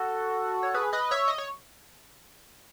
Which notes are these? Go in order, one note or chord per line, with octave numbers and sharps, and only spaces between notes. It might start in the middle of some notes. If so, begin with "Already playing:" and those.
Already playing: F#4 A4
C#5
G#4 B4
B4 D#5
C#5 E5
D#5
C#5